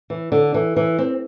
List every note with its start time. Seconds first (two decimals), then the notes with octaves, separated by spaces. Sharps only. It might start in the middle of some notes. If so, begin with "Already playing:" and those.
0.10 E3
0.32 D3
0.54 E3
0.76 E3
0.98 C4